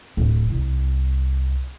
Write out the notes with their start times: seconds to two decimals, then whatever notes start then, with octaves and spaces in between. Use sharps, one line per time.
0.17 D1
0.50 C2